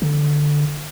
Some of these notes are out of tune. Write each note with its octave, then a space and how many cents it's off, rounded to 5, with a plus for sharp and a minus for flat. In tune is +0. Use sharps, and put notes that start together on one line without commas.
D3 +5